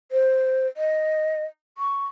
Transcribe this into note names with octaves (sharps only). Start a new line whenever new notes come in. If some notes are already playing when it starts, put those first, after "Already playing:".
C5
D#5
C#6